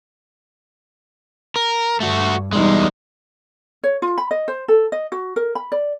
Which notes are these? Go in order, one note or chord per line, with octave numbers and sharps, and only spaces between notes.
A#4
G2 A3 F#4
E2 G3 G#3 D#4
C#5
F4
B5
D#5
C5
A4
D#5
F#4
A#4
B5
D5